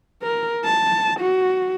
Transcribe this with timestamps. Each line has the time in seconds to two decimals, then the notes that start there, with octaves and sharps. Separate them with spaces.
0.23 A#4
0.65 A5
1.20 F#4